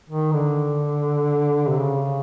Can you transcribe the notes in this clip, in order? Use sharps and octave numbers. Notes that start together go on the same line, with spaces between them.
D#3
D3
C3
C#3